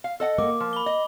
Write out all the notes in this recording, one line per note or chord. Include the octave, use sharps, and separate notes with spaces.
F5
A4 D#5 F#5
A#3 D6
F3
B5 G7
D#5